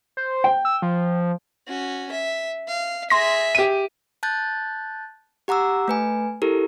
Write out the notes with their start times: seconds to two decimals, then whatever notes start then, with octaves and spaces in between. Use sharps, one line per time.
0.17 C5
0.44 G5
0.65 E6
0.82 F3
1.67 C#4 F#4
2.12 E5
2.68 F5
3.10 G#4 E5 C6 A#6
3.55 G4 D#7
4.23 A5 F#6 G6 A6
5.48 G4 F#5 A#5 D6 E6
5.88 A3 B4 G#5
6.42 E4 G4 A4 A#4